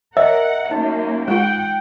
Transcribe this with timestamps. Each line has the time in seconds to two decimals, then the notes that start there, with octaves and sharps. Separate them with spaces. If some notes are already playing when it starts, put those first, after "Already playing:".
0.17 A#4 C#5 D#5 E5 F#5
0.71 F#2 A#3 D#4
1.28 G#3 F4 F#5 G5